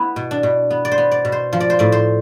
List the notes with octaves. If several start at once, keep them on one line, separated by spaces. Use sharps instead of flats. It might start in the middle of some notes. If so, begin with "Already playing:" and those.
Already playing: B3 E4
B2
D4
B2
B3
D5
C5
B3
D5
B2
C5
F3
D5
C5
A2 D5
C5